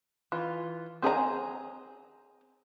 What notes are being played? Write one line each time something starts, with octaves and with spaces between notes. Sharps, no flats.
E3 F4
C4 G#4 G#5 A#5